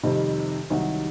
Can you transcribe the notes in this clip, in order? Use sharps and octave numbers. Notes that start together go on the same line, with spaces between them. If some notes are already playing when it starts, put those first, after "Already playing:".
F2 C3 D#3 G3
C2 C3 D#3 F#3